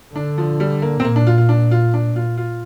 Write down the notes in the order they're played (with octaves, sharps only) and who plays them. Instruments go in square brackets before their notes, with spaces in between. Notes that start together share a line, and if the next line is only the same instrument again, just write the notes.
[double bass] D3 [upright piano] D4
[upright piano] F3
G3
A#3
C4
[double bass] A#2 [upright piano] A#3
[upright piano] D4
F4
F4
D4
F4
D4
F4
F4